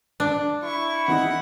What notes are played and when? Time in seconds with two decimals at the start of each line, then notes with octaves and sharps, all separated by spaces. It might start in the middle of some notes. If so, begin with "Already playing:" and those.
0.20 D4
0.63 E4 C#6
1.08 E3 B3 D#4 F#5